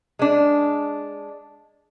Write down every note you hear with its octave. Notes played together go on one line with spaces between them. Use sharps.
G#3 D4